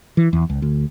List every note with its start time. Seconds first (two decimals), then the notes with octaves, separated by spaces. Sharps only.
0.17 E3
0.33 E2
0.49 C#2
0.62 D2